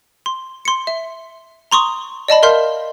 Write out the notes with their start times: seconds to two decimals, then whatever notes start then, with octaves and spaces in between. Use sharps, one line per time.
0.26 C6
0.65 C6 C#7
0.87 E5
1.71 A#5 C6 C#6 D#6
2.28 D5 D#5 A5 B5
2.43 A#4 E5 F5 C6 F6 G6